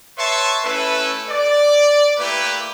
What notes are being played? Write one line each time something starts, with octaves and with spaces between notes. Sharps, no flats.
B4 C#5 E5 A5 C6 C#6
A3 C#4 E4 A4 B4
D5
A3 A#3 E4 G4 B4